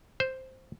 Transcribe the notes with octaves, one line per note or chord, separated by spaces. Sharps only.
C5